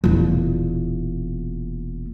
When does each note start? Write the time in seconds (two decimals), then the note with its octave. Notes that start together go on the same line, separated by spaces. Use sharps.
0.04 E1 A#2